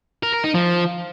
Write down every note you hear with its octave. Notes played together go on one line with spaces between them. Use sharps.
A#4
A#4
D#4
F3